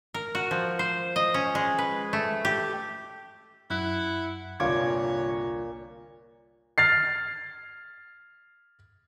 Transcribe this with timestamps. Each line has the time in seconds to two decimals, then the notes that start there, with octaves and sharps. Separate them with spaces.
0.14 A#4
0.35 F#4
0.51 F3
0.79 C5
1.16 D#5
1.34 C#4
1.55 G#3
1.78 B4
2.13 A3
2.45 G4
3.70 F#2 E4 F#5
4.60 G1 C2 A#2 F4 C#5 D6 G#6
6.78 F6 A6 C7